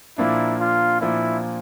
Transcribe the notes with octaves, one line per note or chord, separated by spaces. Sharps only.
A#2 F3 A#3 D4 E4
F4
A#2 F3 A#3 D4 E4